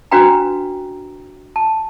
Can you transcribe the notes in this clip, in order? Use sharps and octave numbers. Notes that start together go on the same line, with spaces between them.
C#4 D4 F#4 B4 G5 A#5
A5